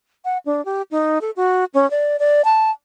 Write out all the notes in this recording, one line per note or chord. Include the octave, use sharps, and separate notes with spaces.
F#5
D4
G4
D#4
A4
F#4
C#4
D5
D5
A5